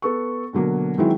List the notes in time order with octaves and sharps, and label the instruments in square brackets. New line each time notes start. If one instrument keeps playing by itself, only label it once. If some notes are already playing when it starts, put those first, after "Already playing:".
[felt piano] B3 A4 C#6
B2 D3 F#3 A#3
D#3 E3 F#3 G#3 C4 E4